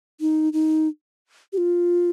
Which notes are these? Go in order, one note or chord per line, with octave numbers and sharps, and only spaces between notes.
D#4
D#4
G4
F4